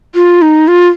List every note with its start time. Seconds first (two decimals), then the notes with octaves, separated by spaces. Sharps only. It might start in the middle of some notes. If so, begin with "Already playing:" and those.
0.15 F4
0.42 D#4
0.68 F4